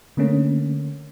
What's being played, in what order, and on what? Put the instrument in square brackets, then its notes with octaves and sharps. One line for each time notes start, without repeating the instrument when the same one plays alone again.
[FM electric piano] D3 A3 A#3 C#4